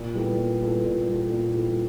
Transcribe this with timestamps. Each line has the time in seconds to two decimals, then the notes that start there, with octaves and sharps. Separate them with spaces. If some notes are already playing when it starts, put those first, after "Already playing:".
Already playing: A#2
0.15 G3 B3 E4 A4
0.38 A#2
0.61 G3 B3 E4 A4
0.85 A#2
1.08 G3 B3 E4 A4
1.32 A#2
1.55 G3 B3 E4 A4